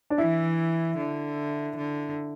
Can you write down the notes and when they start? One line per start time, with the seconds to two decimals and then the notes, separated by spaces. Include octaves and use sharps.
0.10 D4
0.18 E3 E4
0.97 D3
1.77 D3